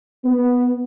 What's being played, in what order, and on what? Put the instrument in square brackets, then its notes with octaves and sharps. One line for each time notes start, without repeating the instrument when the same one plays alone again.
[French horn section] B3